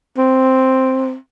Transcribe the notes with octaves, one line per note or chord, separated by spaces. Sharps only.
C4